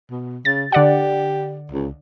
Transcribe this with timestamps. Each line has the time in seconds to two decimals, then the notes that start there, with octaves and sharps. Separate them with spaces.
0.10 B2
0.45 C#3 A6
0.72 D3 G4 D5 F#5
1.71 C#2